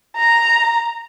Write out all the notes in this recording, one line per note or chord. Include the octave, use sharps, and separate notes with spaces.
A#5